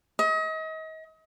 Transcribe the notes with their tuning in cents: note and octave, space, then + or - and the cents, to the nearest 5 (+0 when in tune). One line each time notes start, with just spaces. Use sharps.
D#5 +35